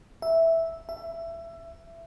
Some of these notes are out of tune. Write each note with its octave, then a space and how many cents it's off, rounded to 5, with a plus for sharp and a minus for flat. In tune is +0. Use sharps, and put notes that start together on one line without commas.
E5 -5
E5 +20